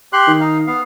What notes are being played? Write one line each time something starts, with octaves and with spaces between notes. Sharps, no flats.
G4 C6 F#6
D#3
D#4 F5
B3 F5